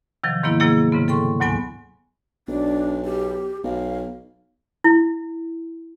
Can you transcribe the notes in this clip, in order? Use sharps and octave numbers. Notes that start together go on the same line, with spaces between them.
C3 D#3 F3 F#3
G#2 D#3 A#3 B3 E4
C3 F#3 A#3 E4 G#4
G#2 C#3 B3
A4 G5 C6 C#6
D2 G#2 F#3 B3 G#5
B1 D4
G4
B1 F5
E4